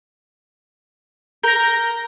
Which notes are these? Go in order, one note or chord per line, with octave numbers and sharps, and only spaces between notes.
A#4 G6 A#6